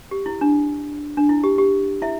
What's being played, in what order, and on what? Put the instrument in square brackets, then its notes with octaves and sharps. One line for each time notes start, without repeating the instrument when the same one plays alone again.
[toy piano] G4
E4
D4
D4
E4
G4
G4
E4 E5